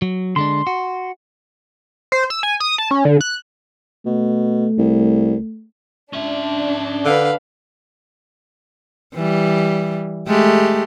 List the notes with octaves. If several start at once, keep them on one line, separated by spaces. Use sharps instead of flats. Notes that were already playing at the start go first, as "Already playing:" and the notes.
F#3
D3 G#3 D4 C6
F#4
C5
E6
G#5
D#6
A5
C#4
D3
F#6
B2 A3
C2
C#4 D4 E5
D3 B4 F5
E3 G3
G#3 A3 G4